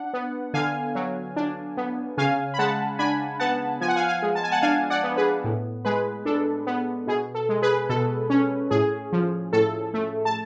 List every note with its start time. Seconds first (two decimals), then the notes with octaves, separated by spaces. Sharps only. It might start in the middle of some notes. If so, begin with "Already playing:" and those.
Already playing: D4 F#5
0.14 B3
0.54 D3 F5 G#5
0.95 F#3
1.36 D4
1.77 B3
2.18 C#3 F5 G#5
2.54 B5
2.59 G#3 F#5 A5
2.99 D4 G#5 B5
3.40 B3 F#5 A5
3.81 F3 G#5
3.88 F#5
3.96 F5 G#5
4.08 F5 G#5
4.22 G#3
4.35 A5
4.44 G#5
4.51 F#5 A5
4.62 D4 F5 G#5
4.90 D5 F#5
5.03 B3
5.17 G#4 B4
5.44 A2
5.85 G#3 G#4 B4
6.25 D4 A4
6.67 B3
7.07 B2 G#4
7.35 A4
7.49 G#3
7.62 G#4 B4
7.89 B2 A4
8.30 C#4
8.71 A2 G#4
9.12 F3
9.53 A2 A4
9.94 A3
10.25 A5